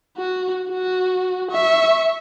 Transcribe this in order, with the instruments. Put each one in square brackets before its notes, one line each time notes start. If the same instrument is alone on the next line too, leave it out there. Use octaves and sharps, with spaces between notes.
[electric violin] F#4
F#4
E5 C#6